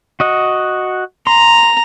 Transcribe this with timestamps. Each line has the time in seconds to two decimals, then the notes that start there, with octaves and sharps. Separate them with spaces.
0.20 F#4 D#5 F#5
1.27 A#5 C6